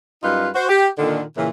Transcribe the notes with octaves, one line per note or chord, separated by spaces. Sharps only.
F#2 G3 D#4 F4 B4 F5
F#4 C5
G4
A#2 D3 D#3
A#2 C#3 E3